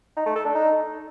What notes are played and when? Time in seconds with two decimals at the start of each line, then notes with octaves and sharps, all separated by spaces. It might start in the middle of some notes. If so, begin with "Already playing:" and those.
0.17 D#4
0.26 A3
0.36 A4
0.45 D4
0.55 D#4